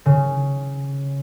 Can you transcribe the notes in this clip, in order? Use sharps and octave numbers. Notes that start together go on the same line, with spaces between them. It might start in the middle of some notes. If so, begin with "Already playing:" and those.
C#3